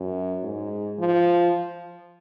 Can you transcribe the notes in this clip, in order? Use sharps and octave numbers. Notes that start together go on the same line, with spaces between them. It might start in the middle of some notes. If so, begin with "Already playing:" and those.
Already playing: F#2
G#2
F3